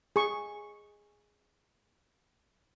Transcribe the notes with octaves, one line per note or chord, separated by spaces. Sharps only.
G#4 C#6